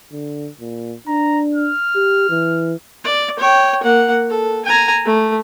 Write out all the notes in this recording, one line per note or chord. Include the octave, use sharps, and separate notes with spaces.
D3
A#2
D4 A#5
F6
G4
E3
D5
C#5 G5
A#3 F#5
A4
G#5 A#5
A3